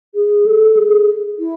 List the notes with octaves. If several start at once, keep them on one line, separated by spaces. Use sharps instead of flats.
G#4
A4
G#4
E4